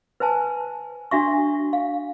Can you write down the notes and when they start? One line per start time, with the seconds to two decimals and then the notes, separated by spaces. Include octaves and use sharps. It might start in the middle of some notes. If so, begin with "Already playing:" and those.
0.20 B4 C5 G#5 A5
1.11 D4 F#4 E5 C#6
1.73 F5